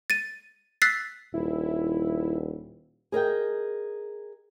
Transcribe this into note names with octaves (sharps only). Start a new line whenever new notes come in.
A6 D#7
E6 F#6 A6 B6 C7
D#1 E4
G#4 A#4 D#5 G5